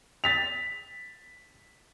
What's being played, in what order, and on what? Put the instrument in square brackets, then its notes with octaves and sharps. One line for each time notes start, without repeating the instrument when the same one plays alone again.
[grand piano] A6 B6 F7